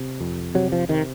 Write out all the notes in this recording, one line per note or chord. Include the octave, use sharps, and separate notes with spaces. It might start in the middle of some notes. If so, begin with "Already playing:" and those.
Already playing: C3
F2
C3 F#3
F3
C3 D#3